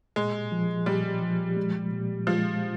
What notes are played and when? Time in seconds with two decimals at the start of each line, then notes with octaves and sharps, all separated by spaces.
0.16 A#2 G#3
0.52 F3
0.86 A#2 G3
1.22 F3
1.57 G#3
1.92 A#2
2.27 F3 G#3